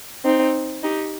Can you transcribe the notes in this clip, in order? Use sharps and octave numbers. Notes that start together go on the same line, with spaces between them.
C4 D#4
D#4 G4